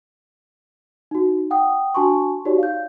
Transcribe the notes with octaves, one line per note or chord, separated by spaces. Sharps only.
D#4 F#4
F#5 G5 D#6
D4 F#4 G#5 A5 C6 C#6
D#4 F#4 G4 C#5 D5
F5 G6